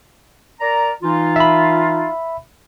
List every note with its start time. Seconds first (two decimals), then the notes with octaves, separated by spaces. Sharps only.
0.60 A#4 D5 A#5
1.03 E3 D#4 F4
1.36 E5 B5